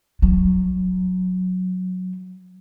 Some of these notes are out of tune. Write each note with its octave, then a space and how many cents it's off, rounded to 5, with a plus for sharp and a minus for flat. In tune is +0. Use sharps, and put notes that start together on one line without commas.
F#3 -10